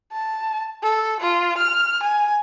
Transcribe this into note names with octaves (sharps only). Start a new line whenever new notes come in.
A5
A4
F4
F6
G#5